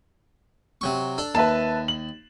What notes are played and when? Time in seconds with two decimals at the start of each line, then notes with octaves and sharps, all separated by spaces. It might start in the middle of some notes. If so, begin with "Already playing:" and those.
0.81 C3 F#3 C#6
1.18 D4 A4
1.35 D#2 B4 E5 A5
1.88 F#7